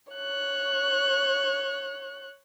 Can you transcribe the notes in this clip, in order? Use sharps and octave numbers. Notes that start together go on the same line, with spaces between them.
C#5 F#6